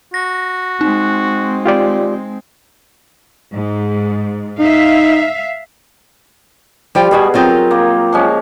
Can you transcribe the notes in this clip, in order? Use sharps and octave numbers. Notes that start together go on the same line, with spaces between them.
F#4 A#6
G#3 C4 D#4
F4 G4 D5
G#2
D#4 E5 F5
F3 G3 F4 G5
B2 G3 B3 F#4 G#4 B4
F#3 C4 F4 A#4 D#5 G5
A#3
F3 G#3 C#4